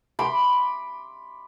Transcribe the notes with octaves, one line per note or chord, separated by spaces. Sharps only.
B5 C6 D6